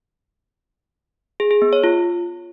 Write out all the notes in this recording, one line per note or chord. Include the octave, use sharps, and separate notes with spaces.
G#4
G#4
B3
C#5
F4